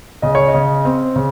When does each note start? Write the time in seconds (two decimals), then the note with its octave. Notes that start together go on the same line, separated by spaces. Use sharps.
0.22 C#3 D#5
0.35 C#5
0.48 D#5
0.54 C#3
0.85 C4
1.16 C#3